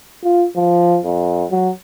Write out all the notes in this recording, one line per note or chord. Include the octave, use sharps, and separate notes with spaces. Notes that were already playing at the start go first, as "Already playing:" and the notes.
F4
F3
F2
F#3